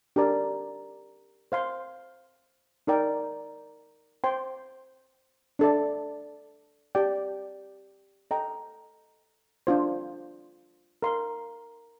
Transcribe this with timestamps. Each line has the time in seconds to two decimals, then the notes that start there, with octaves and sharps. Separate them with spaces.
0.16 D4 G4 A#4 D5
1.52 C5 F5 C6
2.87 D#4 A#4 D5 G5
4.24 C5 G5 C6
5.59 D4 A4 D5
6.95 G4 D5 G5
8.31 A4 D#5 G5 A#5
9.67 D4 F4 C5
11.02 A#4 F5 C6